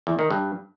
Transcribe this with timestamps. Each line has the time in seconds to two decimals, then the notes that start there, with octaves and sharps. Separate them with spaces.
0.07 E2
0.19 D#3
0.31 G2